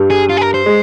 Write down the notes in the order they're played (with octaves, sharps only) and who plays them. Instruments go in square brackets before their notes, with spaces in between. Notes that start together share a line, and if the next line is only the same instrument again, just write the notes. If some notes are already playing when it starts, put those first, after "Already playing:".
Already playing: [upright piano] G2 G3
[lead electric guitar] G#4
F4
G#4
A#4
C5
[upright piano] G#3